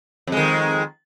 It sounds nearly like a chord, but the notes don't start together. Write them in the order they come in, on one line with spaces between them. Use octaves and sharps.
F2 G#3 D#3